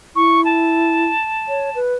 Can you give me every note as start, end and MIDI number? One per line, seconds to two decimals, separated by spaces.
0.16 1.05 64
0.16 0.43 85
0.45 1.79 81
1.48 1.70 73
1.75 1.95 71